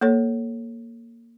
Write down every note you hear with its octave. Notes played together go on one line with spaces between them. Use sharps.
A#3 A4 C#5